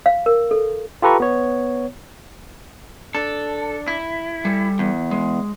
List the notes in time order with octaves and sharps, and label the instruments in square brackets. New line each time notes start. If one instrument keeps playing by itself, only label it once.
[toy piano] F5
A#4
A4
[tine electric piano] F4 G4 A4 B4 A#5 C#6
B3 C#5
[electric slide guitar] D4 [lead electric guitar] A4
[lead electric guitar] E4
[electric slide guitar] G3 A4
[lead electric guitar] E2
[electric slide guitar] G#3